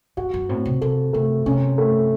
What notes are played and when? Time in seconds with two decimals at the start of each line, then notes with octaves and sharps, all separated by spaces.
0.17 F#2 F#4
0.34 F#2
0.49 A2 C4
0.66 C3
0.81 C3 A4
1.13 C3 A3
1.46 C3 C#4
1.78 A3